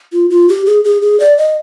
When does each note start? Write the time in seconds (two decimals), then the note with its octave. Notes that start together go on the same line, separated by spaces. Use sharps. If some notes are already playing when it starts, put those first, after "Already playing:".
0.13 F4
0.30 F4
0.49 G4
0.66 G#4
0.84 G#4
1.02 G#4
1.20 D5
1.38 D#5